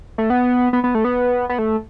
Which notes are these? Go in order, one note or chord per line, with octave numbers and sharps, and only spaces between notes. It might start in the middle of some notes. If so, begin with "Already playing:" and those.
A3
B3
B3
B3
A3
B3
B3
A3